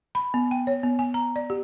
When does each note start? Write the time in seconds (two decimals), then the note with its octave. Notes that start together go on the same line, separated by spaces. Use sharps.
0.15 B5
0.34 B3
0.51 G5
0.67 C#5
0.83 B3
0.99 G#5
1.14 A#5
1.36 D5
1.50 G4